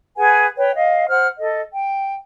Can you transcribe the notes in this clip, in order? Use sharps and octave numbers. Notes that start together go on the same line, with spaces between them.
G#4 B4 F#5 G#5
B4 C#5 G5
D#5 F5
C5 F#5 F6
A4 D#5
G5